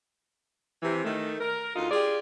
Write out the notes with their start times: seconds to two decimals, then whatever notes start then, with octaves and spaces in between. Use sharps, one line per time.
0.83 C3 E3
1.05 D#3 A3
1.40 A#4
1.75 D2 D#4 F4
1.91 F4 G4 G#4 D5